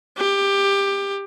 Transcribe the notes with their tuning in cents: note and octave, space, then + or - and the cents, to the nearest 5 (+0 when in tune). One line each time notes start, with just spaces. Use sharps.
G4 +20